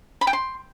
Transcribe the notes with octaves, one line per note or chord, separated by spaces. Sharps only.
B5
G5
C6